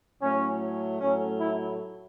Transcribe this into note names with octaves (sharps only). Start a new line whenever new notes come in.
A2 F#3 A3 C#4
A2 F#3 A3 C#4
E4